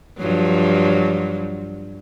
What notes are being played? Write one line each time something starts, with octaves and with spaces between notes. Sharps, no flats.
G2 F3 F#3